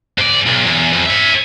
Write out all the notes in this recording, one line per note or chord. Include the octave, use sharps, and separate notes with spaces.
G#2 D5
B1
E2
F2
C#5 E5